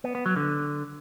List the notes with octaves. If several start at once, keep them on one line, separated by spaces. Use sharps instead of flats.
B3
B3
F#3
D3